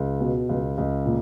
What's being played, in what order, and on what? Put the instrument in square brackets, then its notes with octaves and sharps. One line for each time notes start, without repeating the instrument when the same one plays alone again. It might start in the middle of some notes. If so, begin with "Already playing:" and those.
Already playing: [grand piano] C#2
B2
C#2
C#2
A#2